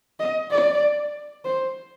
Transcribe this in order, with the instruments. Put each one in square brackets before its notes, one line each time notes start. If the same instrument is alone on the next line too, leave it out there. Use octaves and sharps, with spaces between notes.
[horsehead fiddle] D#5
D5
C5